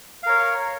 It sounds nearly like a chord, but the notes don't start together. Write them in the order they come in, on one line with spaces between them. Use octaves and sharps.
F5 A#4 C#5